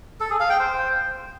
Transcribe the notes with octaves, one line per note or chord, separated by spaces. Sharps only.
A4
G#4
F5
G5
C5